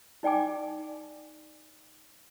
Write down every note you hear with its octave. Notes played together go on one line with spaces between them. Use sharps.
D#4 D5 G5 G#5 D6